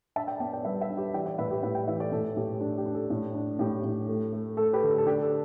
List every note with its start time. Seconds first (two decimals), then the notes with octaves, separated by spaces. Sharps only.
0.16 D4 E5 A5
0.28 D5 G5
0.40 B3 D5 G5
0.53 D5 G5
0.65 G3 B4 E5
0.81 B4 E5
0.90 D4
0.97 G4 B4
1.14 E3 D5 G5
1.26 D5 G5
1.38 A2 B4 E5
1.51 G4 B4
1.63 A2 B4 E5
1.75 D5 G5
1.87 E3 B4 E5
2.00 A4 D5
2.12 A2 A4
2.37 A2 G4
2.61 D4
2.78 G4
2.86 D4
2.94 A4
3.10 A2
3.35 D4
3.59 A2 G4
3.84 A2
4.08 A3
4.33 A3
4.57 A3 A4
4.73 G4 B4
4.82 D3
4.98 A4
5.06 D4 G4
5.23 A4